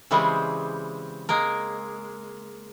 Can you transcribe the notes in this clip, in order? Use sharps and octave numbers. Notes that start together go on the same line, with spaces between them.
C#3 E3 G3 G#3 C4
G#3 A#3 A#4